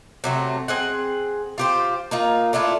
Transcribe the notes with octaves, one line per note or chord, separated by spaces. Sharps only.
C3 F#3 A3
C4 G#4 F#5
F4 G4 C5
A#3 D#4 F4
A3 D4 E4 F4